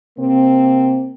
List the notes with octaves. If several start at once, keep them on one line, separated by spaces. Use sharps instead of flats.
C3 A#3 C4